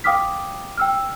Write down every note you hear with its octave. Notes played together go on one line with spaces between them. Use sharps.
F5 G5 D6 D#6 F6 B6
G5 E6 F6